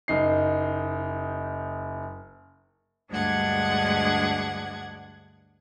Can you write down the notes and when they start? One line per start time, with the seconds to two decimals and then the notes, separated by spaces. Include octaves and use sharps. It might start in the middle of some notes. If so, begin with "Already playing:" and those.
0.08 F#1 D#4 C7
3.10 D2 G2 G#3 D4 F#5 G#6